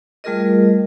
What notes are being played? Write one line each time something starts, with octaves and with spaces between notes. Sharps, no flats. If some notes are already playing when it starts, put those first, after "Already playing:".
G3 A3 F4 G#4 A#4 D#5